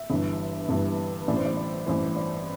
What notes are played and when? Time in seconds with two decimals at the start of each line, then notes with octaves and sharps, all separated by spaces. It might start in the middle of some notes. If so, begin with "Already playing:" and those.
Already playing: E5
0.10 G1 G2 E3
0.69 G1 G2 E3
1.28 A1 A2 E3 D5
1.37 C5
1.46 D5
1.57 D5
1.87 A1 A2 E3 C5
2.16 D5